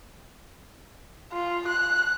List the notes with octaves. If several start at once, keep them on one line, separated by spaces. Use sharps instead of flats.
F4
F#6